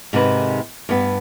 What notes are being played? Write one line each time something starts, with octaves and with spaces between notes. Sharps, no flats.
G#2 C3 D#3 B4
G2 B3